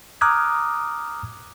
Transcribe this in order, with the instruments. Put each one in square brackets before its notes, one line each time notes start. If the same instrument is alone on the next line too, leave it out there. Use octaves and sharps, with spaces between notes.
[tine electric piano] A#5 D6 D#6 F6 F#6 G#6